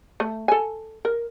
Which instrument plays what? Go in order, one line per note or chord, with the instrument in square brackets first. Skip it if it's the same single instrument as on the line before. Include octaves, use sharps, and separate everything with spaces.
[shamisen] A3
A4 G#5
A#4